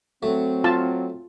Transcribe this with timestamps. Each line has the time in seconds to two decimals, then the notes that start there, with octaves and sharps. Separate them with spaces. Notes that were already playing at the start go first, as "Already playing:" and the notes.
0.23 F#3 A3 C4
0.64 F4 A5